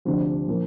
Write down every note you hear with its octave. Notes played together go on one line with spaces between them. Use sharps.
D2 C3 F3 D4
A#2 F3 A#3